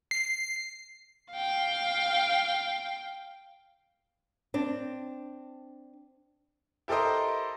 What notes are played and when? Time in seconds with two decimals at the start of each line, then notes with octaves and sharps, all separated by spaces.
0.11 C7
1.32 F5 G5
4.54 C4 D4
6.88 E4 G4 A4 A#4 C5 D#5